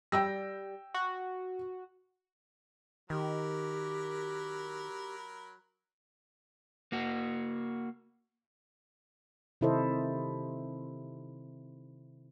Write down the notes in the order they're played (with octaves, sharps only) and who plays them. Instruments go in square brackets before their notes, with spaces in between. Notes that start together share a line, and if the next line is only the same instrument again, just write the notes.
[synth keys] G3 [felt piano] G5 E6 A#6
[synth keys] F#4
[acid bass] D#3 [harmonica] F#3 A#4 B5 [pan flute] G4
[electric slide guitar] A#3 F#4
[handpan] C3 D#3 E4 A4 C5 D#5